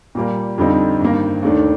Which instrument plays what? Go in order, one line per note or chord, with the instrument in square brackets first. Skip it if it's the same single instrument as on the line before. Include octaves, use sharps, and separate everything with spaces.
[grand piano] A#2 G3 A#3
F2 D3 G3 C4 D#4
G2 D#3 A#3
D#2 D#3 A3 D4